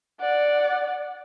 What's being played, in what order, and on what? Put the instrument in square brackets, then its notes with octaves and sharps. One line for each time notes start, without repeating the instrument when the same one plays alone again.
[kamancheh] D5 F#5